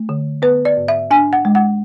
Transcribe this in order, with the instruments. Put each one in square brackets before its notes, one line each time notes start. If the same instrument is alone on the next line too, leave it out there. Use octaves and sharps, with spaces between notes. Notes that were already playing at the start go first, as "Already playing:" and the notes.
Already playing: [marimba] A3
D3
B3 B4
D5
G#2
E5
D4 G#5
F#5
G#3
F#5